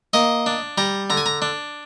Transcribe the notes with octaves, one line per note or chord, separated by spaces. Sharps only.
A#3 D#5
D4
G3 A#5
D3 A#5
G#5
A#5
D4